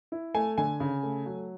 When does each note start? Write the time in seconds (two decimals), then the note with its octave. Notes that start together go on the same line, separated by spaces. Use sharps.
0.12 E4
0.34 A3 G#5
0.58 D3 G#5
0.80 C#3
1.03 A3
1.26 F#3